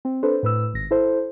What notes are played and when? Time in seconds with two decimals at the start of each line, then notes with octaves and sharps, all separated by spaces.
0.05 C4
0.23 D4 A4 B4 C5
0.43 A2 B4 E6
0.74 G#1 A#6
0.91 E4 A4 C5